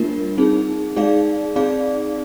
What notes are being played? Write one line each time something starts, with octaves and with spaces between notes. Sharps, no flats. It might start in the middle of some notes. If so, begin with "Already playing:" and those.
Already playing: G3 A#3 D4 F4 A#4
C4 D#4 G#4
G#3 D#4 G#4 D5 F5
C4 D#4 G#4 D5 F5